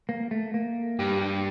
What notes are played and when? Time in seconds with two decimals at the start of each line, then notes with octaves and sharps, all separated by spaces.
0.09 A#3
0.31 A3
0.54 A#3
0.99 G2 G4
1.22 G4